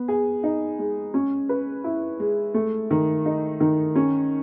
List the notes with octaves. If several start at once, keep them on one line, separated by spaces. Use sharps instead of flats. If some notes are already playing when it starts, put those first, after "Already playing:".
Already playing: B3
G#4
D#4
G#3
C#4
B4
E4
G#3
A3
D#3
D#4
D#3
C#4